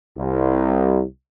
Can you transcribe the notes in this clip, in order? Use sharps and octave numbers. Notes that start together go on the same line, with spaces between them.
C2